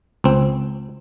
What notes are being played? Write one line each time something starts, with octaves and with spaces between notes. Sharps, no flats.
C#2 C4